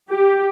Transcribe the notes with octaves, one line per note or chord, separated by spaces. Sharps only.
G4